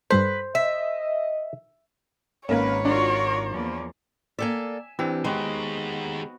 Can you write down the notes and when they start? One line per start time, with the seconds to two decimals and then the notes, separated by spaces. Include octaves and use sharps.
0.11 G2 G3 A4 B4 C5
0.55 D#5 E5
2.49 G#1 G#2 A#3 C#4 B4 C#5
2.85 D4 F4 F#4 A#4
3.52 E2 F3 A#3
4.39 A#3 A4 D5 E5 G#5
4.99 C3 E3 C4 D4 G4
5.25 D#3 G#3 B3 F#4 G4 D#5 C6